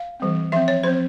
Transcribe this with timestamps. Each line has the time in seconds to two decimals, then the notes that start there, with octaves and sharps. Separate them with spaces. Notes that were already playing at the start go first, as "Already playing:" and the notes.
Already playing: F5
0.20 E3 G3 C4
0.52 F3 C4 E5
0.68 C#5
0.83 F3 C4 C5